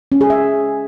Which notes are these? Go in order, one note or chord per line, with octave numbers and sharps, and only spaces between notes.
C#4
G#4
E5